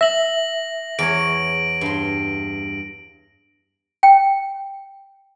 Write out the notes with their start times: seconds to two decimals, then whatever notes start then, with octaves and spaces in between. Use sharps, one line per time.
0.01 E5 A#6 F#7
0.99 E2 C#5 D7
1.81 G2 C6
4.03 G5